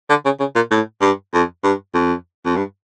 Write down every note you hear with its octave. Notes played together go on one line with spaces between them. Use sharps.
D3
C#3
C#3
A#2
A2
G2
F2
G2
F2
F2
G2